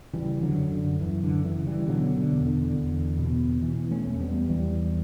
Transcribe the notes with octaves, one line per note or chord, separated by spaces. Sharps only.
C#3 E3 G3
D3 F#3
F#2
D3
F#2 E3
D3
C#3 E3
E3 G3
B2 D3 F#3
D3
E2
D3
E2
B2
B2 E3
A3 C#4
E2 A3
G3 B3
E2 E3 G3